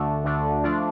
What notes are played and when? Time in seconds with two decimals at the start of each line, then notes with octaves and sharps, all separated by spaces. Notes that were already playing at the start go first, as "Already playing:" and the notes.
Already playing: D2 D3 A3 D4
0.24 D2 D3 A3 D4
0.64 F3 A3 D4 F4